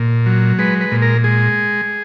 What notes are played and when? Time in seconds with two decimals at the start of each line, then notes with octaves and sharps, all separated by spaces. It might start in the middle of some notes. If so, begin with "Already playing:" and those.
Already playing: A#2
0.26 F#3
0.59 G#3 B4
0.81 B4
0.91 A#2
1.02 A#4
1.24 G#3 G#4